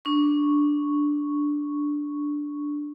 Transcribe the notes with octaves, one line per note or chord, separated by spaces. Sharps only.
D4 C#6